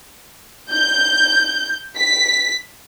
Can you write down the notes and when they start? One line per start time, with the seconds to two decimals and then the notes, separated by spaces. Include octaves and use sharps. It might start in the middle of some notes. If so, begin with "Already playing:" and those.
0.70 G6
1.96 B6